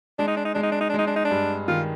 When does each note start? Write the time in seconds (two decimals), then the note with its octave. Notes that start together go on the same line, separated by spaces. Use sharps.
0.19 G#3 D4
0.28 D#4
0.37 D4
0.45 D#4
0.54 G#3 D4
0.63 D#4
0.72 D4
0.81 D#4
0.90 D4
0.94 G#3 D#4
1.07 D4
1.16 D#4
1.25 D4
1.31 G2
1.68 D#3 F4